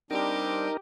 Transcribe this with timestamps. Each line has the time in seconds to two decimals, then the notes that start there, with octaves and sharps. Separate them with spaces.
0.11 G3 C4 D4 D#4 G4 A#4